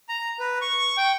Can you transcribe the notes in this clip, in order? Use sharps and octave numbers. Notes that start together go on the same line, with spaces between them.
A#5
B4
C#6
G5